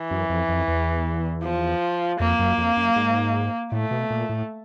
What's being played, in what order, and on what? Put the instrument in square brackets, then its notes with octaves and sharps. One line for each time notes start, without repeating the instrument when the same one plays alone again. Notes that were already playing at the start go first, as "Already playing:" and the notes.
Already playing: [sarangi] E3
[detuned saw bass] F#2
F2
F2
E2
[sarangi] F3
[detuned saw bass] F2 [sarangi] A#3
[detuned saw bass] F#2
F2
F#2
G#2
[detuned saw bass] A2 [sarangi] A3
[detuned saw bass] B2
A#2
A2